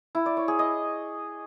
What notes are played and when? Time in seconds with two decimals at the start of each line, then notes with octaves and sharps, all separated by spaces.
0.15 E4
0.26 D5
0.37 C#5
0.48 G#4
0.59 D#5